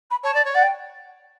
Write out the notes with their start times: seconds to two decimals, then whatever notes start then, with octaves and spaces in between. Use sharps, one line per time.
0.10 B5
0.23 C#5 A5
0.34 D5
0.45 C#5
0.54 D5 F#5
0.62 G5